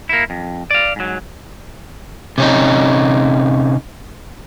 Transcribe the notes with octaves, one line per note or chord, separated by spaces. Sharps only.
A#3 E4
F2
D5 F5
G#2 F#3
C3 C#4 D#4